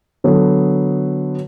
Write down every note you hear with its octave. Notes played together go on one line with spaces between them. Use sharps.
D3 F#3 B3